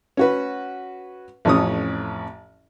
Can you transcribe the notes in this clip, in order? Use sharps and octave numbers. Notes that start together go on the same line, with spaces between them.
C#4 F#4 B4
A1 F2 C#4 D#6